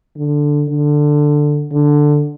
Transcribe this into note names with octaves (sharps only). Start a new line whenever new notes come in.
D3
D3
D3